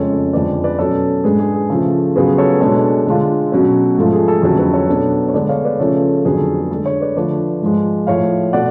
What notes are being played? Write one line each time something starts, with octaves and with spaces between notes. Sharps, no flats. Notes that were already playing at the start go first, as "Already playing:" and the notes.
Already playing: F2 C#3 G#3 C#4 A4 C#5
F2 D3 G#3 B4 D5
B4 D5
B2 F#3 C#4 A4 C#5
G#2 G#3 D4 G#4 B4
G#4
G#4
C#3 F3 A3 A4
C#3 F#3 B3 F4 G#4 B4
A4 C#5
B2 G#3 D4 A4 C#5
D3 G#3 D4 F4
B2 F#3 C#4
G#2 F3 A3 F4 A4
G#4
A4
F2 D3 F#3 A3 C#4 A4
G#4 B4
A4 C#5
B2 F#3 B3 D4
C#5
D3 G#3 B3 D4 B4 D5
C#5 F5
B4 D5
C#3 F3 A3 C#4 F4 A4 C#5
F2 D3 F#3 B3 G#4 B4
A4
G#4
D3 G#3 D4 A4
A4 C#5
B4 D5
D3 F3 A3 B4 D5
G#2 F3 G#3
A2 F3 A3 C#5 F5
B2 A3 D5 F#5